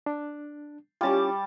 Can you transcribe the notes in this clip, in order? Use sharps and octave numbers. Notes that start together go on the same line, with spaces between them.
D4
G3 C#4 E4 F4 A5 D6